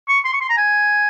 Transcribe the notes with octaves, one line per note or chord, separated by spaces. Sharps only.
C#6
C6
C#6
C6
A#5
G#5